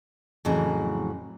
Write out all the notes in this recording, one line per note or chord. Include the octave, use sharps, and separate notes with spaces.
F2 A2 C#3 E3 F#3 A#5